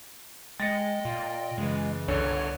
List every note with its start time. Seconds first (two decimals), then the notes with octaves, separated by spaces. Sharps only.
0.60 G#3 D#5 G5 A6 A#6 C#7
1.05 A#2 F4
1.58 F#2 C#3 E3 G#3
2.08 G1 C2 D3 C#5